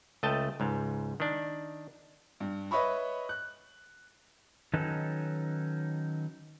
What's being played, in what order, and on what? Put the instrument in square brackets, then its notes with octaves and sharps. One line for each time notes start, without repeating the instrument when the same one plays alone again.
[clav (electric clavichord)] C#2 A3 D#5 G5 A5
C#2 G#2
D#3 D4
[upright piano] G2
B4 C#5 D#5 E5 B5 C#6
F#6
[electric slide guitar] D#3 F#3 C#4 D#4 A4 B4